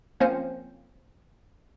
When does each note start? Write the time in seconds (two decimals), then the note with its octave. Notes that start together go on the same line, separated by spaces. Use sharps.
0.20 F3 A#3 C4 C#4 C5